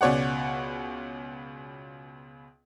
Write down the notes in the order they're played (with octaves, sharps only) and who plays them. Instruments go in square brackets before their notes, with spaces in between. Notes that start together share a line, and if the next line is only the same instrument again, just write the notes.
[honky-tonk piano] C#2 B2 C#5 D5 F#5